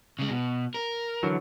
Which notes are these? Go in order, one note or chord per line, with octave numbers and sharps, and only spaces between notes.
C#3 G#3
B2
A#4
D3 E3 F#3